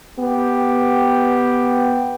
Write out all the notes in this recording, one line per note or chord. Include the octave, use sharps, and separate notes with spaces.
B3 G4 G5